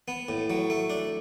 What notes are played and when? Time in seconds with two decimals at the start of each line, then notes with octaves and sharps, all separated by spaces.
0.08 B3
0.29 A2
0.50 F#3
0.70 A3
0.90 D4